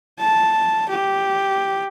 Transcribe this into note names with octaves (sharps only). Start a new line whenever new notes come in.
A5
G4